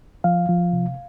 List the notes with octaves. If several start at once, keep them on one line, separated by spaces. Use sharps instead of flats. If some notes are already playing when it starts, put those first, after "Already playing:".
F3 F5
F3
C3